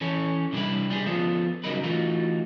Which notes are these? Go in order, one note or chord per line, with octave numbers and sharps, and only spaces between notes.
E3 C#4 A4 C#5
C3 G3 D4 E4 G4 B4
G3 G#3 G#4
F3 B3 F4 A4
C#3 F#3 G3 D#4 A#4 B4
E3 A3 D#4 F4 F#4